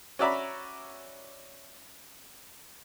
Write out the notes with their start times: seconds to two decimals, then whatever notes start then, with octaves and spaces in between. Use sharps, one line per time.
0.19 C#4 F#4 D5 E5 A#5 B5